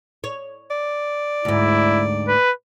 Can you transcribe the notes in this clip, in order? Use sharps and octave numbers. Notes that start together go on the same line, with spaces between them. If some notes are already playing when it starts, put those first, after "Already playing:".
C#5
D5
D2 G#2 E4
B4